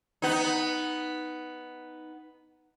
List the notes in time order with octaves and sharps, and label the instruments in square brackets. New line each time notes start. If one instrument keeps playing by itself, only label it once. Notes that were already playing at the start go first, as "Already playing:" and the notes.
[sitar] B3 D#4